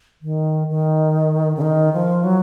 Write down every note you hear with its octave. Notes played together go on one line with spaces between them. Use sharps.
D#3
D#3
C#3
D#3
F3
F#3